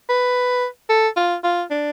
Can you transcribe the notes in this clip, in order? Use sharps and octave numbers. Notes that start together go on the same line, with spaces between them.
B4
A4
F4
F4
D4